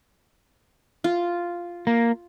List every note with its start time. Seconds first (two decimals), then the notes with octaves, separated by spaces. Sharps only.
1.04 F4
1.87 A#3